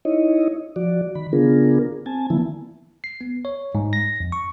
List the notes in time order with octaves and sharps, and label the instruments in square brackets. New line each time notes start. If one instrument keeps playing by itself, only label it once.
[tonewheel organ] D#4 E4 C#5 D#5
F3 F#4 D5
D#3 B5
C#3 B3 D4 F4 G#4 A#4
C4 G#5 A5
D3 E3 F3 A#3 B3 E4
[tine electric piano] C7
B3
C#5
G#2
A#6
F2
C#6